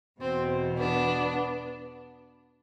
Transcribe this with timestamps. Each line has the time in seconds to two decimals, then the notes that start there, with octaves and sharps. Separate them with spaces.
0.20 E2 B2 C4
0.78 B3 D4